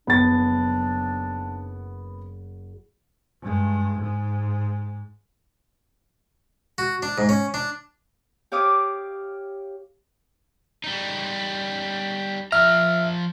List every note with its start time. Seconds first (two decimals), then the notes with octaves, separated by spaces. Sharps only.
0.07 F#1 B3 D4 A6
3.41 G2 G#3
3.99 G#2 G#3
6.78 F#4
7.03 D4
7.18 G#2
7.29 C#4
7.54 D4
8.52 G4 C#5 F5 D6 D#6
10.84 G3 D#4
12.52 F3 E5 A#5 F6